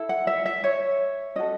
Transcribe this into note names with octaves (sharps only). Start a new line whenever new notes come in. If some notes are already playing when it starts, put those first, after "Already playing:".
Already playing: E4 A4
F#5
E5
E5
C#5
C#4 F#4 A4 D#5